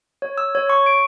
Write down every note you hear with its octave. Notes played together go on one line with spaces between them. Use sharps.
C#5
E6
C#5
C#6
D7